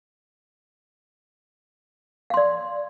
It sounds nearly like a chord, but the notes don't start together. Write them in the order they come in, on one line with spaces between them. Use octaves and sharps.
F5 C6 D5